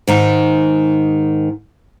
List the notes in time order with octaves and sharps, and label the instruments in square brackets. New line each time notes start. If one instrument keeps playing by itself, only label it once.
[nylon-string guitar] G#2 D#3 D#4